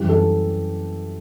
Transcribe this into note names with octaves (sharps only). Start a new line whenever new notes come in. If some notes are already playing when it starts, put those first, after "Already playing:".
Already playing: F#2 E3 G3 G4
A4